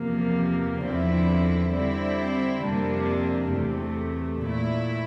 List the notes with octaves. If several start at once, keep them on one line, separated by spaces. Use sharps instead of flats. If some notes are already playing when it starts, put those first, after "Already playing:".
Already playing: E2 C3 F3 A#3
E2 D3 F3 C4 E4
D3 G3 C4 E4
F2 C3 G3 A#3 D4
E2 C3 E3 A3
A#2 A3 E4